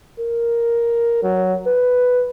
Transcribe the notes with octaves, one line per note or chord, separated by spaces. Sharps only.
A#4
F#3
B4